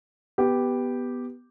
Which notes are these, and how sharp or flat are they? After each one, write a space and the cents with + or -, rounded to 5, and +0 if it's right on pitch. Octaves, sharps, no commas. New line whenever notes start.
B3 +0 G4 +0